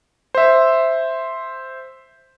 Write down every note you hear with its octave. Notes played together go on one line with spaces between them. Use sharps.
C5 E5